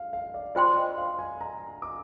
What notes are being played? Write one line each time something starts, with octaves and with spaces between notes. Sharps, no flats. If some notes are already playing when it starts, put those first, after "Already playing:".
Already playing: F5
F5
D5
F4 C5 D5 G5 C6
D#5
F5
G#5
A#5
D6